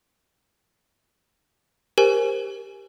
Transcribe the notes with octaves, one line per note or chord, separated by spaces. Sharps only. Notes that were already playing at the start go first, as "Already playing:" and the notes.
G4 A#4 C5 G#5